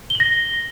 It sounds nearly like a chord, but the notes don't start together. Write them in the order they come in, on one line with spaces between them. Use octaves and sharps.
G7 F#7 A#6